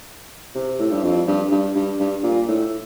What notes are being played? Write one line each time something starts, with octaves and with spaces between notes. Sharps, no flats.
C3
A2
G2
F2
G2
G2
G2
G2
A#2
A2